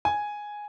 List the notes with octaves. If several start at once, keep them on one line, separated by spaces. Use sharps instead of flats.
G#5